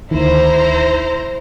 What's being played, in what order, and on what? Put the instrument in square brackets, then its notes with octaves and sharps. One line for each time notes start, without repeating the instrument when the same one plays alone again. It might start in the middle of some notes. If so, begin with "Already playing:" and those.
[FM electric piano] D2 D#3 [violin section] E4 C5 A#5